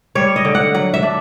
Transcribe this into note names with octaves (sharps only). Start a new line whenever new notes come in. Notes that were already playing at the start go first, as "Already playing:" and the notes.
G3 C#5
D#5
D3
F#5
F#3 F#5
E5
D4